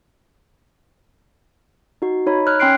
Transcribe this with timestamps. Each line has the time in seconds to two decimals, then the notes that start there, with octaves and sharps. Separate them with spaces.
2.02 D#4 F#4
2.26 D#4 C#5 B5
2.47 C#5 F6 F#6
2.60 C#4 G5 C6 F#6 C7 D7